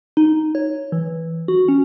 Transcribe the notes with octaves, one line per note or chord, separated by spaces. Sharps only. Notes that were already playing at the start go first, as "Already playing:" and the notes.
D#4
C#5
E3
F#4
C#4